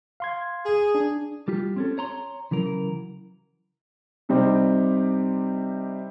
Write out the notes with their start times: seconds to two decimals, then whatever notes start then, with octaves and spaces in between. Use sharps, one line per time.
0.20 F5 C6 G#6
0.66 G#4
0.95 D4
1.48 G3 F4 G4
1.76 C4 C#4 A4
1.98 C#5 A#5 C6
2.51 C#3 E3 F#3 A#4
4.29 C3 G3 C4 D#4